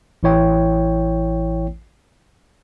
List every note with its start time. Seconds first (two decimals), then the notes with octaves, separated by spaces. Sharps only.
0.23 A1 E3 E4 C#5 G5